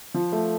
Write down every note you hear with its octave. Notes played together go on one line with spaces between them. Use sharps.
F3
A3